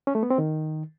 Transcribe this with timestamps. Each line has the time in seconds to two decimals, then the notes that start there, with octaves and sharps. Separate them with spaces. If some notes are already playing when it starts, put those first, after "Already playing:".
0.07 C#4
0.15 A3
0.23 B3
0.30 C4
0.38 D#3